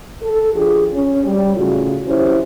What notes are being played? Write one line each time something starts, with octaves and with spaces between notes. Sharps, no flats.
A4
F3 D4 F4 G4 G#4
C#4
G3
A2 C#3 F4 F#4
E3 F#3 C#4 E4 G4 C5